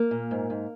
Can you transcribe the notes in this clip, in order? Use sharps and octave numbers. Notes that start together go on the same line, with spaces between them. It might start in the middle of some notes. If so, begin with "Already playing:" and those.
Already playing: A#3
A#2
G#2
G#2